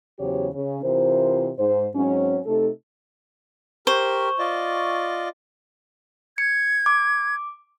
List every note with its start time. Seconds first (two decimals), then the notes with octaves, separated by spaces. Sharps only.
0.19 E2 C#3 F#3 G4 C5 C#5
0.54 C#3 C#4
0.83 C3 E3 F4 A#4 C5
1.59 G#2 C5
1.95 G#2 F#3 C4 C#4
2.46 C3 A3 D#4 A4
3.87 G4 A#4 C5 C#6
4.39 F4 D5 D#5
6.38 G#6 C#7
6.86 D6